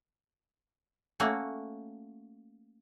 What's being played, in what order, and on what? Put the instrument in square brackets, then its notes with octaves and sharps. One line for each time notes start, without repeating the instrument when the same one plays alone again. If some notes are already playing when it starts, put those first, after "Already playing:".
[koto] A3 A#3 C#4 F#4